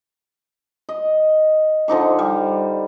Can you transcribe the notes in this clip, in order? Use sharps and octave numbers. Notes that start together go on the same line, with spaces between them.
D#5
D3 F3 D#4 D6
G3